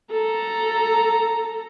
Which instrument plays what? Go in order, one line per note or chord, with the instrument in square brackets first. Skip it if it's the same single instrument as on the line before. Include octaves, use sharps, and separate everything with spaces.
[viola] A4 A#5